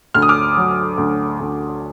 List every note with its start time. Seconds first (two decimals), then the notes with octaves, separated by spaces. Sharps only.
0.14 D2 F6
0.22 D#6
0.29 D6 F6
0.57 F#3
0.98 D2
1.40 D2